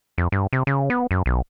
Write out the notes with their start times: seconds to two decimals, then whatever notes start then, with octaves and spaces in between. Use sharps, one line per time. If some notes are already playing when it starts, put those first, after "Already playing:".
0.18 F2
0.32 G2
0.53 C3
0.67 C#3
0.90 B3
1.11 F#2
1.26 B1